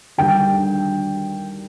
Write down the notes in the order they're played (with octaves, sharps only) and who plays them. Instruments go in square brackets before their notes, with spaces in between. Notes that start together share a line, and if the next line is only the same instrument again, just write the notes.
[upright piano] D#2 D3 G3 D4 [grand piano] G5